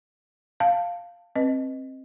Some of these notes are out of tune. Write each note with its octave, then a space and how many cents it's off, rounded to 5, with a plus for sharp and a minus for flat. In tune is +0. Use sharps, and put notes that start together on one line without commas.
F5 +0 A5 +15
C4 +20 B4 -5 D#5 +0